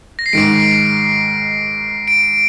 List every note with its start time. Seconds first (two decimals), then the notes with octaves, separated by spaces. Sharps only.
0.19 A#6
0.26 C7
0.33 G#2 D#3 G#3 D7
2.08 D7